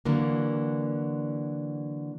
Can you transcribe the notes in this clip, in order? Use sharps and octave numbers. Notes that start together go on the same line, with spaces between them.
D3 E3 F#3 A#3